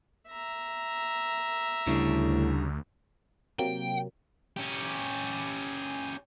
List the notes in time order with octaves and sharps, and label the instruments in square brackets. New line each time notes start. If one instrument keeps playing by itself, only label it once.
[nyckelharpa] E5 A#5
[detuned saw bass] D2 [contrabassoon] A2 [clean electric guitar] C#3 G3 D4
[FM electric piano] C3 F#3 A#3 [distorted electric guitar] G5
[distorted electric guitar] C#4 G4